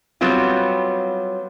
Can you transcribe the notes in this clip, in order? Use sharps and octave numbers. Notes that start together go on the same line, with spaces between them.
F#3 G3 B3 C4 F4